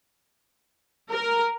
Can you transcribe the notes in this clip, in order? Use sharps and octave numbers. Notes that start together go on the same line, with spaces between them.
A#4